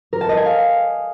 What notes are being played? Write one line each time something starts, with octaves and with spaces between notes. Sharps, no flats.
A#4
A5
D#5
G#5
F5